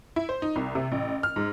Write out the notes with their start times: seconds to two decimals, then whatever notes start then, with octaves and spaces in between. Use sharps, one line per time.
0.16 E4
0.29 C5
0.42 D#4
0.56 C2
0.75 C3
0.92 A1
1.23 F6
1.36 G#2